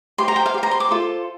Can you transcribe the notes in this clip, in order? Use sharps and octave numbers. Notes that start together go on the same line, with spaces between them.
G4 C5 C6
A#5
G5
F5
G4 C5
A#5
C6
D6
F4 A4 C5